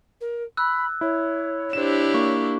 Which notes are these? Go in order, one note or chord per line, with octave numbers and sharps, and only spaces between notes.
A#4
B5 E6 F#6
E4 C#5
D4 E4 G4 C5 E7
A#3 C#6